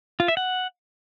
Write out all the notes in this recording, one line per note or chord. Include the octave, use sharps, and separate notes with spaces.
F4
E5
F#5